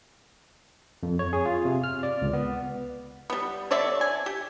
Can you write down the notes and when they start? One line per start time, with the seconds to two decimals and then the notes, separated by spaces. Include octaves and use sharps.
1.03 F2
1.19 C#5
1.33 G#4
1.45 F4
1.65 C3
1.84 F6
2.03 D5
2.22 C#2
2.33 B3
3.30 G3 B3
3.71 D3 C#5 D5 E5
4.01 G#5
4.26 G4